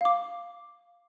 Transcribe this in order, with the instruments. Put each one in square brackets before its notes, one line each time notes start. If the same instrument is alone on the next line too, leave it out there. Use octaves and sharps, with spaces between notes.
[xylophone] F5 D6